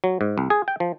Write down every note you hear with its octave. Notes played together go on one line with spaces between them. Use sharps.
F#3
G#2
C2
G#4
G5
F3